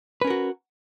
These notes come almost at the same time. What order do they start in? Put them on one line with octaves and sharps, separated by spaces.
B4 C#4 A#4 F#4